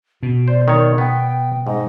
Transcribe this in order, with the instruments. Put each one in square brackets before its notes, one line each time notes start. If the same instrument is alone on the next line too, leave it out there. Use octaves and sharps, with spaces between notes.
[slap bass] B2 [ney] F#4
[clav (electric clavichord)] C5 [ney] D5
[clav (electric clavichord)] D#3 C#5
[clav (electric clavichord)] B3 [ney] G5
[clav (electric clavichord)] G#2 [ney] D#5